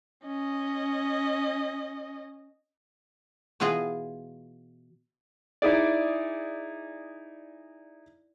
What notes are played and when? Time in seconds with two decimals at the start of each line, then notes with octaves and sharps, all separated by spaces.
0.24 C#4 D#5
3.60 B2 E3 B3 F4 G#4 D#5
5.62 D#4 E4 G#4 D5